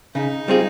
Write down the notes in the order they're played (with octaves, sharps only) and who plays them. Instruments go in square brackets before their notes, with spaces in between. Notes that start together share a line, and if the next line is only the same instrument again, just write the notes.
[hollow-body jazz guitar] C#3 [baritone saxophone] D#4
[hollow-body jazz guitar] G3 C4 F4 G#4